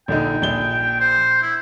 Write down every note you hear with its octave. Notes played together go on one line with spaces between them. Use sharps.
A#1 D3 D#4 G5
A#1 G7
C5
E4